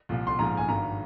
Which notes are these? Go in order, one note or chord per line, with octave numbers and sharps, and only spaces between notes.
C2 A#2 F3
C6
A#1 G#2 F3 A#5
G#5
G#1 G2 D#3 A#5